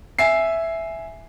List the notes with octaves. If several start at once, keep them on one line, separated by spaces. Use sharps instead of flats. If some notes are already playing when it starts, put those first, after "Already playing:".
E5 G#5 C7